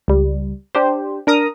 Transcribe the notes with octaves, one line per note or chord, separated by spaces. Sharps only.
C#2 G3
D4 G4 C5
D4 A#4 A#5 D#6